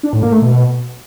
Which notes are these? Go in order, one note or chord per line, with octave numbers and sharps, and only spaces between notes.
D4
A2
A#3
A3
B2